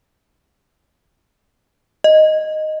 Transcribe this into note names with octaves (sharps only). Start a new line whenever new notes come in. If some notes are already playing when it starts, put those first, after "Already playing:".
D#5